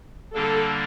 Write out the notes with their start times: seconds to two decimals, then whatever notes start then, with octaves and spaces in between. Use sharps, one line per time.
0.34 D3 G3 A#3 D4 A4